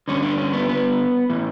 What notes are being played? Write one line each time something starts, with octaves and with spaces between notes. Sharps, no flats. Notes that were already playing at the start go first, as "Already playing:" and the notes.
G2 D3 C#4
D4
C#4
B3
B3
A2 E3